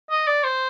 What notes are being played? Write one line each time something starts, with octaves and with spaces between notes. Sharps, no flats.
D#5
D5
C5